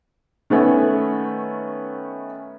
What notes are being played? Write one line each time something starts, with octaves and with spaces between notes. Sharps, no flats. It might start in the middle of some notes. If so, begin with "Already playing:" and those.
D#3 A3 B3 C#4